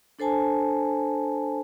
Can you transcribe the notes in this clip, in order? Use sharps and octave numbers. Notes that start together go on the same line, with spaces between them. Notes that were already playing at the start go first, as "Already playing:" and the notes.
D4 A4 C5 G#5 A5